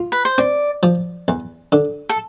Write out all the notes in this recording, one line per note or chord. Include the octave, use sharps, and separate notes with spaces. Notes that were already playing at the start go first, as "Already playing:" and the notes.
Already playing: F4
B4
C5
C4 D5
F3
E2
D3
A4